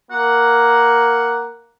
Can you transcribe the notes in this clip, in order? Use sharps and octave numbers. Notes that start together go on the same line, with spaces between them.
A#3 F#5